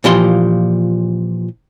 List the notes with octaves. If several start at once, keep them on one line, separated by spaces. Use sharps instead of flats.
A#2 E3 F3 G4 D#5 C6